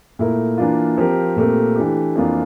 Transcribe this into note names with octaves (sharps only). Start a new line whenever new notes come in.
A#2 A3 E4 A#4
E3 A#3 D4 F4
F3 C4 G4 A#4
A#2 A3 C4 G4 A#4
E3 A3 D4 G4
F2 E3 A#3 D4 F4